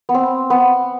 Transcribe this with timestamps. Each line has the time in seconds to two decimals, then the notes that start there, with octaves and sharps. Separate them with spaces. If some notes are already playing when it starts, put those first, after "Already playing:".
0.09 B3
0.14 C4
0.50 B3